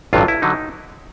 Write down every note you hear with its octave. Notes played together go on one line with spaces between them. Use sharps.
A1 G2 D3 F#3 F4
E4
D3 F#3 D#4